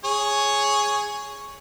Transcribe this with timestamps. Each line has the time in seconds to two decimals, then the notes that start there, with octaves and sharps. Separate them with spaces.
0.04 G#4 C#5